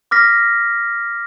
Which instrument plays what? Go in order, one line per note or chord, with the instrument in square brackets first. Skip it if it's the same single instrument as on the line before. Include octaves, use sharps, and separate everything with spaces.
[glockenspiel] D6 F6 A#6 B6